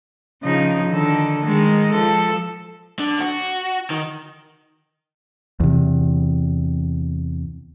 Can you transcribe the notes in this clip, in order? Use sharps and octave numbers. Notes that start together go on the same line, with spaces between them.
C#3 F3 D#4
D3 D#3 A4
D#3 G#3
F3 A4
D3
F#4
D#3
E2 C3